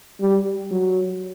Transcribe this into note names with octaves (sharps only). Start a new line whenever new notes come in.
G3
F#3